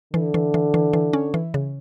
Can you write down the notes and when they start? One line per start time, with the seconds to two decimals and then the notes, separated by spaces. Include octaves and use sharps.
0.14 D3 E3
0.34 E3
0.54 E3
0.74 E3
0.93 E3
1.13 C#4
1.34 E3
1.54 C#3